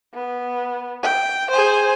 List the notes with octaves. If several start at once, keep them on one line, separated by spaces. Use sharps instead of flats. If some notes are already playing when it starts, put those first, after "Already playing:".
B3
G5
G#4 C5